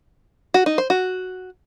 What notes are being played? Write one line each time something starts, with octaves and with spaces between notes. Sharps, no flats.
F#4
D#4
C5
F#4